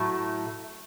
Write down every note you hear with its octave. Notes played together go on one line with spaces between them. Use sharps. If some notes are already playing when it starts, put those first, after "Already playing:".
Already playing: A2 F#3 A3